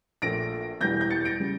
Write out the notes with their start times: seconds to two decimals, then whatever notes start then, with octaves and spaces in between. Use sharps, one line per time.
0.22 A#1 A#2 A3 A#6 D7
0.81 E1 E2 E3 G3 G6 A#6
1.01 G6 A#6
1.10 A6 C#7
1.25 A#6 D7
1.40 C#3 G3